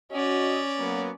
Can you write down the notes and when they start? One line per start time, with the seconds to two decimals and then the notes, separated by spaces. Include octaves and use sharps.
0.12 C#4 F#4 D5 D#5
0.79 F#3 A#3 B3